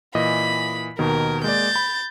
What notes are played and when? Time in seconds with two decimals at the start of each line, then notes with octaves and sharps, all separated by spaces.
0.15 A#2 E3 D#5 B5
0.99 D#2 B2 D#3 A#4
1.44 G#3 A#3 D5 G6 A6
1.76 B5